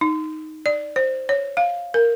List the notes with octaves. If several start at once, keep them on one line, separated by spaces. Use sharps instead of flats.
D#4
D5
C5
C#5
F5
A#4